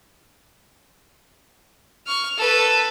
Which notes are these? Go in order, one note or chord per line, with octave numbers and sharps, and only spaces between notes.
C#6 F6
A4 B4